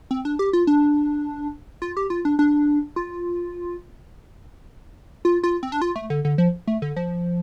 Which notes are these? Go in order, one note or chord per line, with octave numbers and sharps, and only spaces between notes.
C4
D4
G4
F4
D4
F4
G4
F4
D4
D4
F4
F4
F4
C4
D4
F4
A3
D3
D3
F3
A3
D3
F3